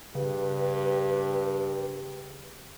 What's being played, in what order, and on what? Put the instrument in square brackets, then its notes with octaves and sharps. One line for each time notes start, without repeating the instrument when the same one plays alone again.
[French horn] G2 [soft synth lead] C#3 [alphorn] G4 [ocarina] B4